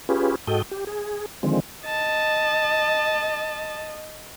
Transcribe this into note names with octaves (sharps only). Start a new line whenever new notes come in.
C#4 F4 G4 G#4 B4
G#2 F#4 A4 D#5 G5
G4
G#4
D3 D#3 F3 G#3 C4
D#5 A5